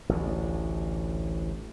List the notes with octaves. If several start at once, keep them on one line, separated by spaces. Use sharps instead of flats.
A1 D2